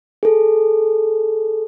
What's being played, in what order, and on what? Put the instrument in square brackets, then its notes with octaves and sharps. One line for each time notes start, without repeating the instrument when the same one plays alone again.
[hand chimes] G#4 A4